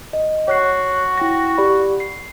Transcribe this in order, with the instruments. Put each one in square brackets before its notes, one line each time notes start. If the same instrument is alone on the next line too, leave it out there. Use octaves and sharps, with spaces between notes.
[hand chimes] D#5
[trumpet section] F#4 [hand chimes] C#5 F#6 C7
[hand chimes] E4 G5 A#6
G4 D5 B5
C7